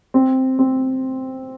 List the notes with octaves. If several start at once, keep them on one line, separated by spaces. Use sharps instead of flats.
C4
C4